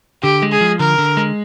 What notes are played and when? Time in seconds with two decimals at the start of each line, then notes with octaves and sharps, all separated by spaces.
0.23 D3 G4
0.42 G#3
0.52 G#4
0.61 F3
0.79 D3 A#4
0.98 D3
1.17 G#3